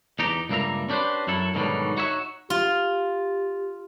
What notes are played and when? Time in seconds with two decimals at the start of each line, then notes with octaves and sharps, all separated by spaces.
0.19 E2 D#4 G4 A#5
0.49 C#2 G2 G3 A#3 E5 A#5
0.89 C#4 D4 G4 B4 C5
1.27 F#2 F#3 E4 A4
1.54 G#2 B2 D3 D#3 F#3 G3
1.97 D#4 F#4 C#5 E5
2.50 F4 G4